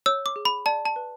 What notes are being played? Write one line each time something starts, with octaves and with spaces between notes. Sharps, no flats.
C#5 E6
D6
G#4
B5
D5 A5
A5
B4